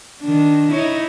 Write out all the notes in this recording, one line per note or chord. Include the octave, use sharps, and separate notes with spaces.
D#3 D4
D#4 E4 C#5